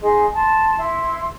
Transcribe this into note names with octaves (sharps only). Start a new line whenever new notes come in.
D#4 G#4 D#5 C6
A5 C6
E4 C6